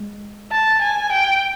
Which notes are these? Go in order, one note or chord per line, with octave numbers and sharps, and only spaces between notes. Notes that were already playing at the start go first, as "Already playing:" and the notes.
Already playing: G#3
A5
G#5
G5